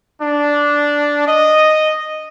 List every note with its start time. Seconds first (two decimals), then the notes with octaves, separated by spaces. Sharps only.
0.22 D4
1.28 D#5